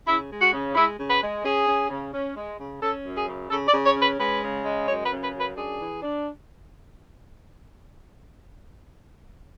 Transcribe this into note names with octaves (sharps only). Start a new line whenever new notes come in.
C#3 E4
G#3
F#4
C#3
G#3 E4
C#3
B4
G#3
C#4 G#4
C#4
C#3
C#4
G#3
C#3
C#4 A4
F#2
G#4
C#3
C#3 A4
D5
C#3
C#5
C#4 B4
G#3 B4
C#3
G#3
F#2 C#5
B4
C#3
B4
F#2
B4
D4 G#4
E3
D4